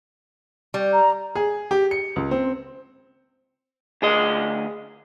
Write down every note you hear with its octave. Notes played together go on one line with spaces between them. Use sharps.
G3
A#5
G#4
G4
C#7
C#2
C4
D2 G#4 D#5